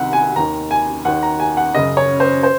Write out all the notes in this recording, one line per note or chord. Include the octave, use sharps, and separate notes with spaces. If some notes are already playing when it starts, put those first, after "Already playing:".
Already playing: C2 C3 D#3 F#5
G#5
D#2 D#3 A#5
G#5
D#2 D#3 F#5
A#5
G#5
F#5
F#2 C#3 D#5
C#5
C5
C5